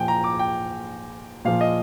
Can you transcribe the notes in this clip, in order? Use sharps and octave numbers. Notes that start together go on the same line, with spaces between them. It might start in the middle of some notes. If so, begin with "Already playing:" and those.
Already playing: A#2 F3 G5 G#5
A#5
D6
G5
A#2 F3 F5
D#5